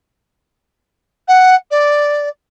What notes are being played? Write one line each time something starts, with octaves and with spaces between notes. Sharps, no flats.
F#5
D5